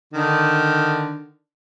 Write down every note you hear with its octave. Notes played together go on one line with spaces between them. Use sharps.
D3 D#3